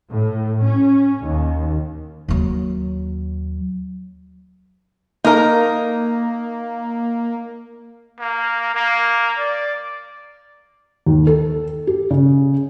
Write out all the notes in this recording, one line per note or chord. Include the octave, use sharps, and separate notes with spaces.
A2
C#4
D#2
D#2 F#3
A#3 D#4 A#4
A#3
A#3
D5
D#2
A4
G4
C#3